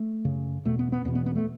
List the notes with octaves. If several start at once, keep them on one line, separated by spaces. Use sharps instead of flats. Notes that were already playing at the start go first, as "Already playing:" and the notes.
Already playing: A3
F#2 C#3
E2 B2 A3
B3
B3
E2 B2 B3
B3
B3
A3